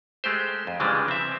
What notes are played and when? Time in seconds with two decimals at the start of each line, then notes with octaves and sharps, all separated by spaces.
0.24 G#3 A3 G4 C5
0.67 F2
0.80 C#3 E3 F3 G3 G#3 D4
1.08 C4 E5